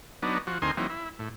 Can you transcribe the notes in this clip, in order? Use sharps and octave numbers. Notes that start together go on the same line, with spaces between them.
F#3 B3 D4 D#4
F3 F#4
D2 C4 D#4 A#4 G#5 C6
E3 F#3 A#3 C4 D#4
E4
A2